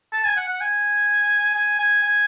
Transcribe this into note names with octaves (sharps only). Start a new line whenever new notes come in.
A5
G#5
F#5
F#5
G#5
G#5
G#5
G#5